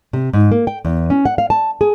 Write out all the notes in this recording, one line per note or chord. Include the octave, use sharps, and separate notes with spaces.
C3
G#2
A#3
G5
E2
C#4
F#5
F5
A5
G#4